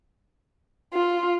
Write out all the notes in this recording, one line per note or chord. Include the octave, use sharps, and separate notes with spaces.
F4